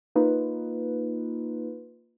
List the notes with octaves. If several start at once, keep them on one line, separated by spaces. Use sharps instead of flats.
A#3 D#4 F4 B4